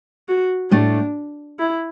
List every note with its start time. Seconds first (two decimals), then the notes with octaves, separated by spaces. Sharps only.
0.29 F#4
0.71 A2 A3 D4
1.59 E4